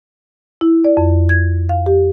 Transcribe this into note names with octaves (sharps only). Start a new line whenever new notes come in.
E4
D5
F2
G#6
F5
G4